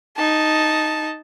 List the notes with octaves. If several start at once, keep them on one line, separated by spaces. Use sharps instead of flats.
D#4 A5